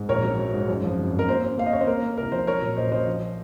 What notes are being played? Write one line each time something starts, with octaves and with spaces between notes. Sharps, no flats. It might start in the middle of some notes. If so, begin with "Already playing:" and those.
Already playing: G#2
A#1 A#4 C#5
F#3
F#3
G#2
F#2
F3
G#1
G#1
A#4
A#3 C5
C#4
A#3 F5
D#5
C#4 C#5
C5
A#3 A#4
A#3
C2 A#4
F3 C5
F#3 A#4 C#5
A#2
A#1 C5 D#5
A#1 C5 D#5
F3